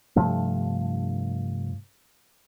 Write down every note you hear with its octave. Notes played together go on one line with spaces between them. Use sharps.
G2 C3 F3 A3